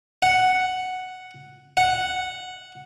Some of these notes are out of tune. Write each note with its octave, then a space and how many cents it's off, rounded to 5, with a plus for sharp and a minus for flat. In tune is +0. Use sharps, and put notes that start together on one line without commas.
F#5 +0
F#5 -5